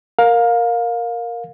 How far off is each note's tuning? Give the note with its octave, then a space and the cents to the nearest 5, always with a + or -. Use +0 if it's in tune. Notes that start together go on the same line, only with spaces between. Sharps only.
A#4 +0 F5 +20